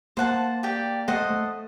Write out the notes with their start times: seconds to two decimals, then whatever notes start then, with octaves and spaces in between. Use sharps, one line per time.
0.17 A#3 C5 F#5 A5
0.63 G4 D5 G5
1.08 A3 C5 D#5 F#5
1.30 A3